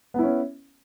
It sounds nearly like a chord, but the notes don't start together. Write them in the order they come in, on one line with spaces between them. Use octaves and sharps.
B3 E4 C#4